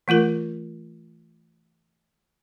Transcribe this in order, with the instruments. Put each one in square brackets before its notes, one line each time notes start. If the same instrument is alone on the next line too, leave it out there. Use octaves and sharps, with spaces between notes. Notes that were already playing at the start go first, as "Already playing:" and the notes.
[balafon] E3 A3 F4 A#4